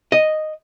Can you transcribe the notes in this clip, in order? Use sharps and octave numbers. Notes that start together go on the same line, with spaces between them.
D#5